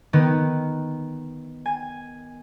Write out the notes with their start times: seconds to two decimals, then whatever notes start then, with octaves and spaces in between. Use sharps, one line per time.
0.13 D#3 B3
1.66 G#5